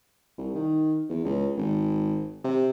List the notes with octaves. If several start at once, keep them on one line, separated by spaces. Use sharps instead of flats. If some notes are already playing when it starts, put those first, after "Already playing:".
C2
D#3
E2
C#2
G#1
C3